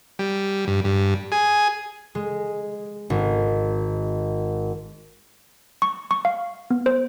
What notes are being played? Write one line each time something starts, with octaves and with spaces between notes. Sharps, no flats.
G3
G2
G2
G#4
G#3
G#1
C#6
C#6
F5
B3
C5